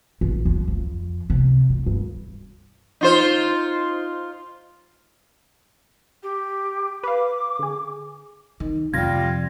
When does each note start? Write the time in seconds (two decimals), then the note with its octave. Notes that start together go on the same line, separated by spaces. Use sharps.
0.21 A1
0.45 F2
0.68 F2
1.30 C3
1.70 B2
1.86 G2
3.01 D#4 F4 C5
6.23 G4
7.04 B4 F5 D6
7.59 D3 G#4
8.60 D#3
8.93 F2 C3 F3 G3 F4 G#6 A#6